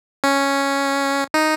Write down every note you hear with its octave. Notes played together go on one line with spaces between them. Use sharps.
C#4
D#4